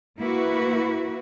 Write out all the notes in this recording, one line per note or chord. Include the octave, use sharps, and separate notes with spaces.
A#3 E4 F#4 B4